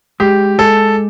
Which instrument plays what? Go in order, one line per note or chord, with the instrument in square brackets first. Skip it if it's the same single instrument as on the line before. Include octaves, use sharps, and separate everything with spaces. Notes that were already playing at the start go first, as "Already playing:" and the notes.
[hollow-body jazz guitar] G#3 [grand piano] G4
[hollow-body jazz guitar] G#3 [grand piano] A4